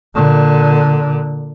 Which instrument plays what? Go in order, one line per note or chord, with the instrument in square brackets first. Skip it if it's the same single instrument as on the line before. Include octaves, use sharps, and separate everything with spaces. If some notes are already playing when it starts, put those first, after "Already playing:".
[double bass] A#2 D3